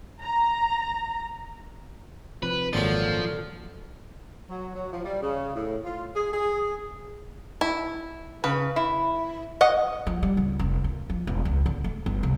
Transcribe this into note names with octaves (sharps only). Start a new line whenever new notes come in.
A#5
C3 F3 B4
G#1 A#2 D3 F3 F#3
F#3
F#3
F3
G3
C#3
A2
F4
G#4
G#4
E4
C#3 B4
E4
D#5 F#5
F3
G3
C#2
F1
A#3
F3
E1
C#2
D3
A3
G1
C2